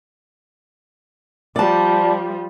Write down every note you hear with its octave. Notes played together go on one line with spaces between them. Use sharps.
F3 G3 D5 A5